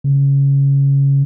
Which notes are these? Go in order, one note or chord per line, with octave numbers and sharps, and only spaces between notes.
C#3